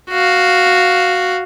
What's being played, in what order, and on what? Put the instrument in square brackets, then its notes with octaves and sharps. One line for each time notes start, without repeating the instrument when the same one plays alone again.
[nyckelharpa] F#4 F5